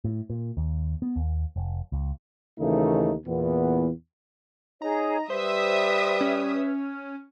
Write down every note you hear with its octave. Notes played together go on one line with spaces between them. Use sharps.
A2
A#2
D#2
B3
D#2
F1
C#2
D#2 C#3 E3 A3 A#3 D#4
E2 A#2 E3 B3
D#4 G#4 C#5 A#5
G3 B4 C5 E5 D#6
C#4